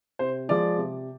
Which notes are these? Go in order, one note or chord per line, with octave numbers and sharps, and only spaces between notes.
C3 C5
F3 G#3 D5
C3